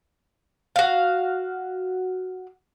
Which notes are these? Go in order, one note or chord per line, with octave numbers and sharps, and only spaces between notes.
F#4 F5